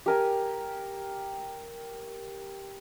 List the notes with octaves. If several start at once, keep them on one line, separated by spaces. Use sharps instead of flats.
G4 A#4 G#5